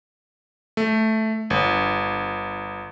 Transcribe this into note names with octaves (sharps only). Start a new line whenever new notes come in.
A3
G1